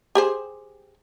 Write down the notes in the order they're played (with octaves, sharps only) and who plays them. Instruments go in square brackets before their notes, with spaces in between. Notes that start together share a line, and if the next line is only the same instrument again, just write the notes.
[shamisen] G4 G#4 C5